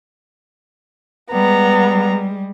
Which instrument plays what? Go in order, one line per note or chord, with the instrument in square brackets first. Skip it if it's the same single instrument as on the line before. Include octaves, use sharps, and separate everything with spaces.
[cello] G3 G#3 [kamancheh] B3 A#5